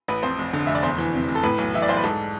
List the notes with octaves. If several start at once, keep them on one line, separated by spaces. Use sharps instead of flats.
A1 B4
F2 C5
F1
D3
F1 E5
D5
E2 C5
E3
C3
F1
A4
A2 B4
B1
E3 E5
D5
B1 C5
B4
G#2 A4